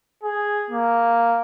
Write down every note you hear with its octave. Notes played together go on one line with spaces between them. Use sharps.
G#4
A#3